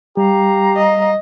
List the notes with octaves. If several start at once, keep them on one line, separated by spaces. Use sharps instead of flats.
G3 G4 F5 A#5
D#5